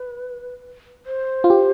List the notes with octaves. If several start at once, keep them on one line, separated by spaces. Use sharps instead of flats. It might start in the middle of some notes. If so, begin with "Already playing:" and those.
Already playing: B4
C5
F4
G4